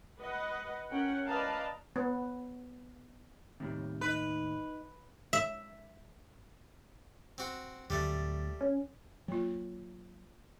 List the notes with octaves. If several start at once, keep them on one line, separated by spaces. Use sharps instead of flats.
B4 D#5 F#5
C#4 A#4 F#5 G5
B4 D5 D#5 F5 A5 A#5
B3
D#2 A2 C3 D#3 G3
D#4 B4 D#5
E5
C4 F#4
D2 F#3 G3 A3
C#4
F#3 A#3 F4